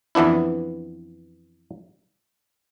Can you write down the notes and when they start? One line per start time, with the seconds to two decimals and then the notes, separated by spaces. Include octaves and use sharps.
0.15 F2 E3 B3 D4 E4